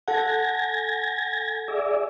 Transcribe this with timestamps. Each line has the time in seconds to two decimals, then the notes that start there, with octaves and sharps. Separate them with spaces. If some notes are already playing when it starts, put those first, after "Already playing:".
0.08 A4 F#5 G#5 G#6 A#6
1.68 G#4 D5 E5